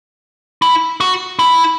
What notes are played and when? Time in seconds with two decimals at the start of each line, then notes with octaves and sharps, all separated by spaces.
0.62 E4
1.01 F#4
1.39 E4